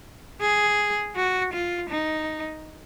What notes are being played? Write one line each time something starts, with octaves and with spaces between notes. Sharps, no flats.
G#4
F#4
F4
D#4